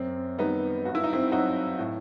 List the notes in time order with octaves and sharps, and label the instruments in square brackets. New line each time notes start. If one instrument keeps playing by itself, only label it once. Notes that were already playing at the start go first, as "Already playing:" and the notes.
Already playing: [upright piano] F#2 C4
D#3 G3 B3 D#4
G2 F#4
E4
D#4
C4 E4
F#3 D#4 F#4
A2